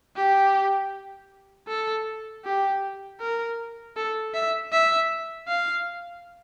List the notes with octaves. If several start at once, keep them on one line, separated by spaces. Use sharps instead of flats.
G4
A4
G4
A#4
A4
E5
E5
F5